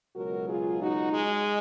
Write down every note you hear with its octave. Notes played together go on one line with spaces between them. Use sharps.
C#2 B2 F#3 F#4 A#4
F4 G#4
D#4 F#4
G#3